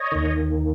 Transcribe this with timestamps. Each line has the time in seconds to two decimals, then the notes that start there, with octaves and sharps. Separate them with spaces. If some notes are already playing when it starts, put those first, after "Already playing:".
Already playing: C#5 D#5
0.12 D#2 D#3